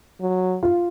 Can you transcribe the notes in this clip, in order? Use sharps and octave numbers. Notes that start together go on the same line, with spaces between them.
F#3
F4